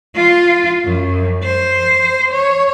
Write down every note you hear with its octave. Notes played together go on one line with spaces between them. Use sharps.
F4
F#2
C5
C#5